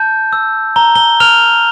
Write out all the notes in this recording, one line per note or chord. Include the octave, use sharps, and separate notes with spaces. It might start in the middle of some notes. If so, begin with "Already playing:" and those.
Already playing: A5 G6
E6
A#5 G7
G7
F6 F7